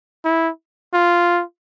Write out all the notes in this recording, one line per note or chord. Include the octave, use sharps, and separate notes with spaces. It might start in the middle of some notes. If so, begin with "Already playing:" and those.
E4
F4